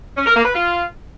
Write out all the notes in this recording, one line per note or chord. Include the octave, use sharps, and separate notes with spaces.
C#4
A#4
A#3
B4
F4